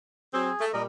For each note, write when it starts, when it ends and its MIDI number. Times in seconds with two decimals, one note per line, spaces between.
0.34 0.50 54
0.34 0.50 60
0.34 0.65 68
0.60 0.70 57
0.73 0.85 46
0.73 0.85 55
0.73 0.82 70
0.73 0.82 75